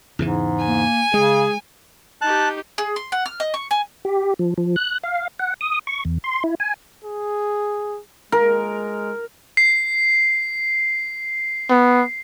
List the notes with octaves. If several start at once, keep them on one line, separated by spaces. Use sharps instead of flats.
E2 G#2 C#3 E3
A#3 G#5
C#3 G#3 G#4
D#4 G4 A5 F#6
G#4
C6
F#5
F6
D#5
C#6
G#5
G4
F3
F3
F#6
F5
F#5
D#6
C#6
E2
C6
E4
G#5
G#4
G#3 A#4
C7
B3